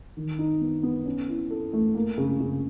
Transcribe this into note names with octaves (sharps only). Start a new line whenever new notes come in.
D#3
D#4
B3
B3
C#4
E4
A4
A3
A#3
C#3
C#3